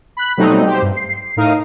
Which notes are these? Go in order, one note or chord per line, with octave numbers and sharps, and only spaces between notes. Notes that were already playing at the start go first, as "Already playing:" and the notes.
B5 F#6
B2 F#3 G3 A3 C4 D#4
G4 C5
G2
C7
A2 D#4 A#4 F5 D#6